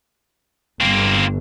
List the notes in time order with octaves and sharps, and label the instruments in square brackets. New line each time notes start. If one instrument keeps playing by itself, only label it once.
[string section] G1 [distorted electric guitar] A#3 C4